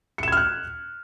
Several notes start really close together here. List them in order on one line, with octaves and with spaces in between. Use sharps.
C#7 E7 G#6 F6 F#6